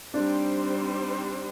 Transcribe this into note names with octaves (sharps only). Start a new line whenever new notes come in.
G3 C4 D4 D#4 G4 C5